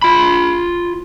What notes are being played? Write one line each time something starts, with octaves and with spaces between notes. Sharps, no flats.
F4 B5